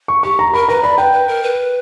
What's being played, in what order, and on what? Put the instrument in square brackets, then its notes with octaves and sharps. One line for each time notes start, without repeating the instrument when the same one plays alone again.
[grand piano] C#6
[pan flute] G4 [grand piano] C#6
[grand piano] A#5
[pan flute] A#4 [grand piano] B5
[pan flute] B4 [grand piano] A#5
[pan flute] D5 [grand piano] B5
[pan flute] B4 [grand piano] G5
[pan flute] B4
A#4
B4